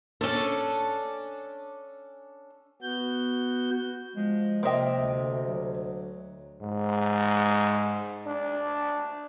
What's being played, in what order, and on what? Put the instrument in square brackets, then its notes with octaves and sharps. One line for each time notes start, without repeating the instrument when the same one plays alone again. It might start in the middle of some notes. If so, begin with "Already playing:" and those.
[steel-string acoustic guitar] C#4 D4 A4
[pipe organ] B3 F#4 G6
[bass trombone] F3 [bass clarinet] G#3
[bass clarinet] C3 [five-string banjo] A#3 E5 G5 [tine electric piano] C5 D#5
[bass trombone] D2
[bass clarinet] F#3
[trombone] G#2
D4